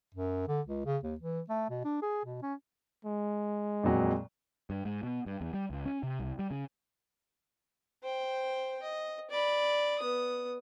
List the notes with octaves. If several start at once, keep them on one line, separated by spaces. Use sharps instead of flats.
F#2
D3
C#2
C#3
D#2
E3
A3
B2
D4
G#4
B2
C#4
G#3
F2 A#2 F#3
G2
G#2
B2
G2
E2
G3
C#2
C#4
C3
C2
G3
C#3
C5 G5
D#5
D5 B5
B3 D#6